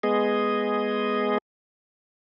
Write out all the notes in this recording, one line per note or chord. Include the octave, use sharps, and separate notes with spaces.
G#3 B3 G#4 D#5